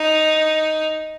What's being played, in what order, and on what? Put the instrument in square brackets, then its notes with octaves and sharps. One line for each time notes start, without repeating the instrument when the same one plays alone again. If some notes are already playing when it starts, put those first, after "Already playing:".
Already playing: [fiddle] D#4